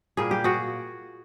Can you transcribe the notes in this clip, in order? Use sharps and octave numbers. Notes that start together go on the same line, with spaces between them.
A#2 G3 A#3 G#4
G4
F#4 G#4